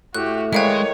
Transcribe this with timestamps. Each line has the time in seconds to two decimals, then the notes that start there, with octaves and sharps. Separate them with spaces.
0.14 A2 F#4 G4 F#6
0.53 D#3 G3 G#3 B4 C#5 E5 F5 G5